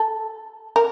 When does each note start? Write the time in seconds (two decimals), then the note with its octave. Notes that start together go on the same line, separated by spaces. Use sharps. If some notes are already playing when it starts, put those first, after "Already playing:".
Already playing: A4
0.76 A#4